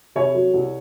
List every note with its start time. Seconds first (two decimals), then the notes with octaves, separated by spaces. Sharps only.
0.15 C3 C#5
0.34 F#3
0.54 C2